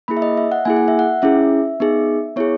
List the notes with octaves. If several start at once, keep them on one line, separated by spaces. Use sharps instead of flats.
A#3 E4 G#4 B5
E5
D#5
E5
F#5
A#3 E4 G#4 G#5
F#5
E5
F#5
C#4 E4 G#4 E5
B3 D#4 G#4
B3 E4 G#4 C#5